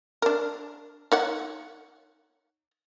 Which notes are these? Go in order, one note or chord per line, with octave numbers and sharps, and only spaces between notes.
D4 A#4
D#4 C#5 F#5